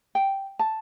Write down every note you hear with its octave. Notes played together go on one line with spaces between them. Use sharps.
G5
A5